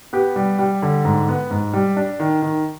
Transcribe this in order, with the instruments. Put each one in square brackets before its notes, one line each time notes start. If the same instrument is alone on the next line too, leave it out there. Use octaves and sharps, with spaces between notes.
[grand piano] B3 G4
G3
G3
D3
G#2
B3
G#2
G3
D4
D#3
D#3